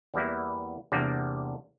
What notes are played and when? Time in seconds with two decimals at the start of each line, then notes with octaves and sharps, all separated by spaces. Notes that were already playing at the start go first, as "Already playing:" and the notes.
0.14 E2 E3 G3 A#3 E4
0.92 E2 C3 G3 A#3 D4